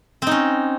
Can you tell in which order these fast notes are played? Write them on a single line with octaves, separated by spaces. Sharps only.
C4 D#4 C#4